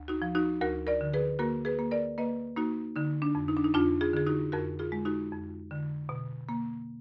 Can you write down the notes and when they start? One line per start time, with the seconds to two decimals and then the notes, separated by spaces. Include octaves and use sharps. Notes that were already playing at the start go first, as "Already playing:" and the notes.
Already playing: D2
0.08 D#4 F#4
0.22 F3
0.35 D#4 F#4
0.61 D2 F#4 A#4
0.87 A#4 D5
1.01 D3
1.13 G#4 B4
1.39 A#3 F#4 A#4
1.65 G#4 B4
1.79 A#3
1.91 A#4 D5
2.18 A#3 B4 D#5
2.57 A#3 D#4 F#4
2.96 D3 D#4
3.22 D4
3.35 F2
3.48 D#4
3.57 D4
3.64 D#4
3.74 F2 D4 F4
4.01 F4 G#4
4.13 D3 G#4
4.27 D#4 F#4
4.52 F2 F#4 A#4
4.79 F4 G#4
4.92 G#3
5.05 D#4 F#4
5.32 F2
5.71 D3
6.09 B2
6.49 A#3